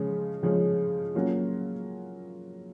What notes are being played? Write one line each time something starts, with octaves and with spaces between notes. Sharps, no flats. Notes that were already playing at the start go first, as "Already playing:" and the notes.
Already playing: C#3 F3 G#3 C#4
C#3 F3 G#3 C#4
F#3 A#3 C#4 F4